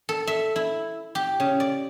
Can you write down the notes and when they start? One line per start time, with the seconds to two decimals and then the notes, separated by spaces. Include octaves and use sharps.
0.09 A4
0.27 E5
0.56 E4
1.15 G4
1.40 C#3
1.60 D5